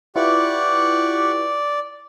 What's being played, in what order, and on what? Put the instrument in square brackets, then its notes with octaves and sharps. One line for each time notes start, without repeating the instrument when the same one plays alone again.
[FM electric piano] E4 F4 B4 [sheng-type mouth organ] G4 F#5 C#6 [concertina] D5